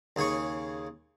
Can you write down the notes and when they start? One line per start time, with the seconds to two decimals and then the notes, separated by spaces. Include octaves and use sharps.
0.16 D#2 C#3 G#4 G#5 C#6